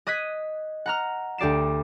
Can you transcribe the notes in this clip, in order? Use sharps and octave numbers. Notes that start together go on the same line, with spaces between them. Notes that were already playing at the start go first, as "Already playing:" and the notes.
D#5 D#6 F#6 G#6 B6
F#5 A#5 F6
D2 G4 D5 C7 E7